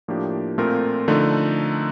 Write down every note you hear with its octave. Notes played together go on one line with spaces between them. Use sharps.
A2 F3 A#3 D4 G4
A#2 A3 C4 F4 A#4
D3 F3 A3 D#4